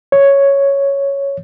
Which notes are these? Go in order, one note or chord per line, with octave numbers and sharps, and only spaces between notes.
C#5